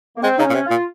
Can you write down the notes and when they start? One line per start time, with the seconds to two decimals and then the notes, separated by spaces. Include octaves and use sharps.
0.17 A#3
0.22 G#3 C4
0.38 C#3 D#4
0.44 C#4
0.50 A#2
0.54 C3
0.66 A#2 F4